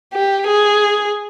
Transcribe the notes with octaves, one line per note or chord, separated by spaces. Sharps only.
G4
G#4